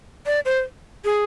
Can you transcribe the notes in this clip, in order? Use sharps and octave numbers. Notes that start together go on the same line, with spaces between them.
D5
C5
G#4